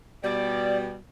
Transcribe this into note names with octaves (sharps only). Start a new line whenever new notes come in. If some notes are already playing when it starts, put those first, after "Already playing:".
B2 G3 D5